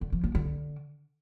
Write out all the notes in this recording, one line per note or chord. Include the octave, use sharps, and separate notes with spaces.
D3
F3
A#3
D3